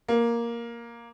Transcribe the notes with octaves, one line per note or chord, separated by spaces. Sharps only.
A#3